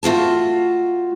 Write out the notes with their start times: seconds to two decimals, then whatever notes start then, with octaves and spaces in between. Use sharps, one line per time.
0.03 A3 F4 F#4 A5